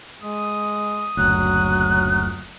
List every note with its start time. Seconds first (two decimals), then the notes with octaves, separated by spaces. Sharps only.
0.22 G#3 D#6
1.17 F#1 D2 F#3 F#6